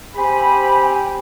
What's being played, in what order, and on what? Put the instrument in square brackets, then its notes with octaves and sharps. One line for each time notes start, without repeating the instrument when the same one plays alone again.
[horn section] C4 C5 B5 [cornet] G4 [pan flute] G#5